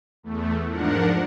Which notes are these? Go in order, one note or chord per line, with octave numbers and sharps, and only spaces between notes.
E2 A3
G#2 F3 D4 A#4 F#5